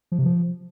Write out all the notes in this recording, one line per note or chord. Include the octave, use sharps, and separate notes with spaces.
F3
C3
F3